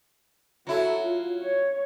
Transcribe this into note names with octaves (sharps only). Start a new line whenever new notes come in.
F#3 E4 F#4 A4
F4
C#5